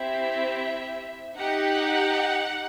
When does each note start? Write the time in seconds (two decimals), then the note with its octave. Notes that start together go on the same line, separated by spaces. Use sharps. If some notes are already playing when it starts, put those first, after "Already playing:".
Already playing: C4 E4 G4 E5
1.36 D#4 G4 F#5